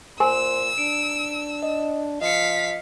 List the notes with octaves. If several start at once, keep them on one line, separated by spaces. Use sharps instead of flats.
A#2 A#4 C5 G#5 C6 E6
D4 D7
D#5
F3 D#5 F5 B6 C#7